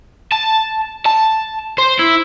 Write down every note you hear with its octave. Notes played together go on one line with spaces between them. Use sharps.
A5
A5
C5
E4